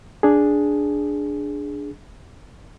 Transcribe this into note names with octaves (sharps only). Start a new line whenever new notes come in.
D4 G#4